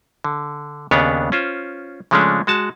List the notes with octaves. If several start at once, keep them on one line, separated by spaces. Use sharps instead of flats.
D3
D#2 C#3 B3 D4 B4 C#5
C#4 F4 C5
C#3 F3 G#3 A3 C#4 D4
G#3 F#4 A5